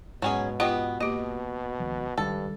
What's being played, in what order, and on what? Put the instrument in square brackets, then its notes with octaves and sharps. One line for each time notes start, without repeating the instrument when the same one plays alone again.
[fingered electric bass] G#2 [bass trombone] B2 [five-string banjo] F#3 C#4 G#4
[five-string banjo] B3 D#5 [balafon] F4 G4 G5
[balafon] A#3 G4 [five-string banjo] D#5
[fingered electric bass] C#2 D#3 F3
[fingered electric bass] C#2 D#3 G3 [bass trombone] G2 [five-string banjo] A4